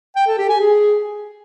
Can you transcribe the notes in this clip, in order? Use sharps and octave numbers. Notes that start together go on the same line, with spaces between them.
G5
A4
G4
G#5
G#4